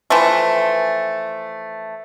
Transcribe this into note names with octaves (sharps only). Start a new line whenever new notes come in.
E3 F3 A3